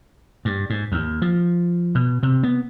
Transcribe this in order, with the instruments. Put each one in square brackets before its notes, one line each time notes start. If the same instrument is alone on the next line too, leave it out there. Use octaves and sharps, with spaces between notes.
[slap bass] G2
G#2
D#2
F3
B2
C3
B3